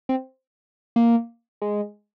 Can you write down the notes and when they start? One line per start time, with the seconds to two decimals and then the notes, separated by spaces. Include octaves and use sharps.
0.09 C4
0.96 A#3
1.62 G#3